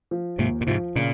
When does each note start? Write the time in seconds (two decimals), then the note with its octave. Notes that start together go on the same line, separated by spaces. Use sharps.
0.11 F3
0.39 D#2 G#2 C3
0.61 A#2
0.67 G#2 C3 F3
0.96 A#2 C#3